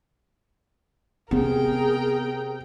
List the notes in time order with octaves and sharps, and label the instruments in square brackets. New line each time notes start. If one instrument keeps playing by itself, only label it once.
[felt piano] C3 [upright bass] B3 [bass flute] G#4 [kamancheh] A#4 G5